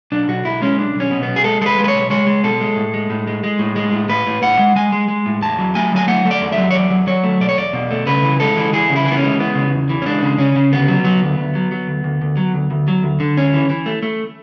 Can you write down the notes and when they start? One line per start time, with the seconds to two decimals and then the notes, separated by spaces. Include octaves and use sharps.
0.12 B1 D4
0.28 B1 F#4
0.45 B1 E4
0.62 G#3 C#4
0.78 B1 D4
0.95 B1 C#4
1.11 B2
1.23 B1 B3
1.36 G#4
1.44 G#3 A4
1.62 G#3 A4
1.66 B4
1.78 G#3
1.84 B4
1.88 C#5
1.95 B1
2.10 G#3 C#5
2.27 G#3
2.44 B2 A4
2.61 G#3
2.76 A2
2.94 G#3
3.10 A2
3.27 G#3
3.44 G#3
3.59 A2
3.76 G#3
3.92 A2
4.09 A2 B4
4.27 A2
4.42 A2 F#5
4.59 G#3
4.76 G#3 G#5
4.92 G#3
5.08 G#3
5.26 A2
5.41 E2 A5
5.59 F#3
5.75 A3 G#5
5.92 F#3 G#5
6.08 A3 F#5
6.25 A3
6.31 D5
6.41 E2
6.52 E5
6.57 F#3
6.71 C#5
6.75 E2 D5
6.90 F#3
7.07 F#3 C#5
7.24 A3
7.41 B2 D5
7.49 C#5
7.57 E2 D5
7.73 B2
7.91 A3
8.06 C#3 B4
8.23 E3
8.40 G#3 A4
8.57 E3
8.73 E3 G#4
8.90 C#3
8.96 E4
9.06 E3
9.12 B3
9.17 C#4
9.23 G#3
9.39 E3 B3
9.55 C#3
9.72 E2
9.89 E3
10.02 C#4
10.05 G#3 D4
10.22 C#3
10.38 C#3 C#4
10.56 C#3
10.72 D2 B3
10.88 F#3
11.04 F#3
11.22 D2
11.38 D2
11.55 F#3
11.72 F#3
11.87 D2
12.04 D2
12.21 D2
12.37 F#3
12.54 D2
12.71 D2
12.88 F#3
13.03 D2
13.20 D3
13.37 D2 C#4
13.54 E3
13.70 E3
13.86 A3
14.03 A3